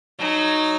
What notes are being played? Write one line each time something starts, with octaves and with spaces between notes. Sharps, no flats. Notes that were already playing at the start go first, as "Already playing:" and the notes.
F#3 D#4